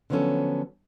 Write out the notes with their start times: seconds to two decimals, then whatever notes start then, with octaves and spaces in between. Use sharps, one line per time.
0.10 D3 F3 F#3 B3 C#4 A4